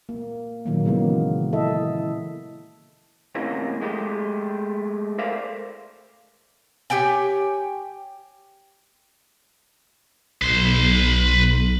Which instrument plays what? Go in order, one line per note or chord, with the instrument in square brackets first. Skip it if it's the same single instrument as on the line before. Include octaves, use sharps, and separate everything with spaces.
[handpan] A#3
A#2 D#3 F#3 A#3
C#3 E3 F#3 G#3 A#3 B3
E4 A4 D#5 E5
[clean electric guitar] A2 C3 E3 A#3 C#4 D#4
G#3 A3 G4
A4 A#4 C5 D5 E5 F5
[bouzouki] G4 C#5 G5 G#5
[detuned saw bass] B1 [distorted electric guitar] B4 C6